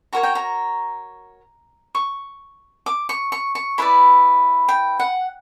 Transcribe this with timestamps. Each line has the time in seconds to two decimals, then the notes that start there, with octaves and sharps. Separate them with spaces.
0.13 F#4 A#4 C#5 A#5
0.23 G5
0.35 A#5
1.95 C#6
2.86 D6
3.09 C#6
3.32 C#6
3.55 C#6
3.78 E4 B4 D5 B5
4.68 G5
5.00 F#5